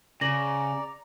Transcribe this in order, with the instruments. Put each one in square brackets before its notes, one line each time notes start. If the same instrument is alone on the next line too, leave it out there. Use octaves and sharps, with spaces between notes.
[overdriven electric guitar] C#3 [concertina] D5 [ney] A#5 [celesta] A#6 F#7